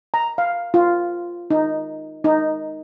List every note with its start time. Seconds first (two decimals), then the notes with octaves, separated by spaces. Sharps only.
0.14 A#5
0.38 F5
0.74 F4
1.50 D#4
2.24 D#4